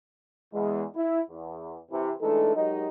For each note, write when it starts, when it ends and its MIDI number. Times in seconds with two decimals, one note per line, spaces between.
0.53 0.84 40
0.53 0.84 56
0.95 1.20 64
1.29 1.78 40
1.91 2.11 48
1.91 2.11 52
2.21 2.52 52
2.21 2.52 56
2.21 2.52 57
2.21 2.52 62
2.21 2.52 63
2.21 2.52 69
2.55 2.87 54
2.55 2.87 56
2.55 2.87 63
2.55 2.87 67
2.55 2.87 70
2.55 2.87 75